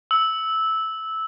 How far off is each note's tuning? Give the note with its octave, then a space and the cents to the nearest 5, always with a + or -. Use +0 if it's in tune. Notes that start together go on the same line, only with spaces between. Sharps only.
E6 -10